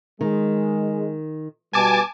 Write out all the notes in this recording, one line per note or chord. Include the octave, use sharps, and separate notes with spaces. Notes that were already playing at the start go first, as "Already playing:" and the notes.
D#3 G#3
B2 G3 B4 G#5 A5 D6